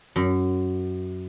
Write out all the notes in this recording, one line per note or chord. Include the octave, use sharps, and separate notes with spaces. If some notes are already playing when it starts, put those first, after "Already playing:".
F#2